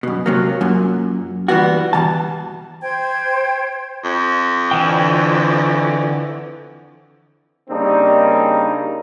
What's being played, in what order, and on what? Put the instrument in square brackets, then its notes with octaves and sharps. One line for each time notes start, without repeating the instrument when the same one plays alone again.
[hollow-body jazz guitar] F#2 B2
C3 F#3 A#3
F#2 A#2
A#2 E3 G3 B3 F#4
G2 B2 E3 A5
[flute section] C5 G5 G#6
[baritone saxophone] F2
[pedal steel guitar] D3 E3 G5
[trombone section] C#3 G3 A#3 C4 D4 D#4